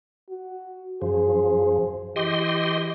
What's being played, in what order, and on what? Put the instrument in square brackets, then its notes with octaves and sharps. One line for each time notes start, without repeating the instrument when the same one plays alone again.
[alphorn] F#4
[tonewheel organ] F#2 F3 [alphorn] G#4
[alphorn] E3 [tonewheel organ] G4 D#5 C6